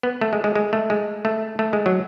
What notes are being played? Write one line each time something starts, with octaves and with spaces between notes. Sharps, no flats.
B3
A3
G#3
G#3
G#3
A3
G#3
A3
A3
G#3
F#3